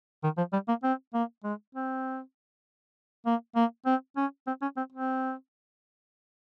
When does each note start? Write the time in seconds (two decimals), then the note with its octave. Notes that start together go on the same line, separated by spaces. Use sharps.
0.24 D#3
0.38 F3
0.53 G3
0.68 A#3
0.84 C4
1.14 A#3
1.44 G#3
1.75 C4
3.26 A#3
3.56 A#3
3.86 C4
4.17 C#4
4.47 C4
4.62 C#4
4.77 C4
4.92 C4